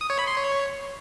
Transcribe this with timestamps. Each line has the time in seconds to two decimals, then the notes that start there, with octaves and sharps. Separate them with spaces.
0.01 D#6
0.10 C#5
0.19 B5
0.27 C6
0.36 C#5